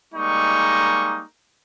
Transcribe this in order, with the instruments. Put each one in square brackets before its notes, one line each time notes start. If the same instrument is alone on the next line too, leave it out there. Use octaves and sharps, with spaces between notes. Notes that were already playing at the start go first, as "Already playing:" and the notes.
[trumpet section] G3 G#3 A#3 D#4 A#5 C#6